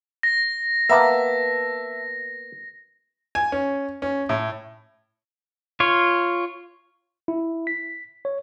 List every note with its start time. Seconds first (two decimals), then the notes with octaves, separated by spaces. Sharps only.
0.23 A#6
0.89 A#3 B3 B4 E5 A5
3.35 G#5
3.52 C#4
4.02 C#4
4.29 A2
5.80 F4 C#5
7.28 E4
7.67 B6
8.25 C#5